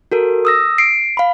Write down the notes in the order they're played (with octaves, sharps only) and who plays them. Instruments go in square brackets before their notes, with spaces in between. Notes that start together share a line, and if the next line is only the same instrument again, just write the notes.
[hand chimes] F#4 A4 A#4
D#6 E6 A#6
C7 D7
F5 B5